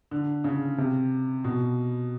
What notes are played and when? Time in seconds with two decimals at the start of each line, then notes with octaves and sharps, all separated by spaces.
0.11 D3
0.44 C#3
0.78 C3
1.44 B2